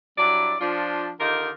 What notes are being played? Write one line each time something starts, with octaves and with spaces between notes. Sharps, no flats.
G2 F#3 E4 D5
F3 D4 F4
D3 D#3 D#4 F4 G4 A#4